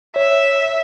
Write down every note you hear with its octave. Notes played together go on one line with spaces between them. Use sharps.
C#5 E5